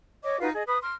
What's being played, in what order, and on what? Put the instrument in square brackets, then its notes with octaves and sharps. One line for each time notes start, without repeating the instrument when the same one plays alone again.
[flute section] C#5 D#5 D6
D#4 F4 F#4 B4
G#4 D#5
B4 B5 D#6
C6 F6